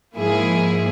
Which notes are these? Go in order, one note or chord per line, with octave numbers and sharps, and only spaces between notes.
G#2 F3 A#3 E4 G#4